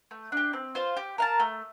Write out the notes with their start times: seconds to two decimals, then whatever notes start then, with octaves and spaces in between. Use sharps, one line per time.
0.11 A3
0.32 D4 G4
0.53 C4
0.75 F4 C5 F5
0.97 G4
1.18 A#4 F5 A5
1.40 A3